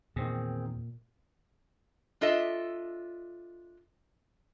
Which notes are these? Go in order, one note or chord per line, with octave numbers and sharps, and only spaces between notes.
E2 A#2 D#3 C4 G#4
D4 F4 A4 D#5 E5